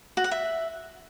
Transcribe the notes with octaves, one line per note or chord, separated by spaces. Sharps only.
F#4
F#5
E5